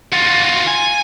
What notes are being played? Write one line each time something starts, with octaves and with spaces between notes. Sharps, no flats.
F4 F#4
G#5